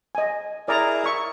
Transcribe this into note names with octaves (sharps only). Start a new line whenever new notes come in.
D#5 G#5
E4 G#4 A#4 D5 A#5
E5 C#6